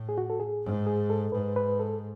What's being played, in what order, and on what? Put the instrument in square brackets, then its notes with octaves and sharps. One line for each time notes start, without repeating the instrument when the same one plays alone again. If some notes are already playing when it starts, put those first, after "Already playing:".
Already playing: [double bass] A2
[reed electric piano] G#4
F#4
A4
G#4
[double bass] G#2
[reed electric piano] G#4
A4
[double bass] G#2 [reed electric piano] B4
[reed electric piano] B4
A4